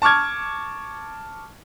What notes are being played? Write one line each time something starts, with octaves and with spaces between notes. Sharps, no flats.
A5 C#6 D6 F6 G#6